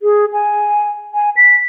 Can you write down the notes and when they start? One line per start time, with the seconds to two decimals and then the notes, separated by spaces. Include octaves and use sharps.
0.02 G#4
0.33 G#5
1.14 G#5
1.37 B6